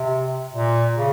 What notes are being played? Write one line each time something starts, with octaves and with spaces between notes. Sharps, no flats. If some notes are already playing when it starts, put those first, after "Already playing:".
Already playing: C3
A#2
C#3